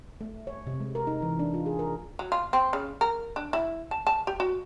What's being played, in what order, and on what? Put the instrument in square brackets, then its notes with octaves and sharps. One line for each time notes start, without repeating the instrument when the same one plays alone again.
[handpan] A3
C#5
C3
G#3
A#4
D#4
E3
D4
F4
G#4
A#4
[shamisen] F#3
F4
C4
C#3
A#4
D4
E4
A5
A5
G4
F#4